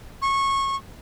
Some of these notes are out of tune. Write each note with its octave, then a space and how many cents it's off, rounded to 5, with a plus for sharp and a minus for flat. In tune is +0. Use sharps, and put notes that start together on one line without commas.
C#6 -20